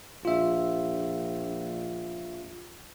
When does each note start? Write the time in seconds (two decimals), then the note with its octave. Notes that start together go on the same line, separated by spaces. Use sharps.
0.25 A#1 F4 E5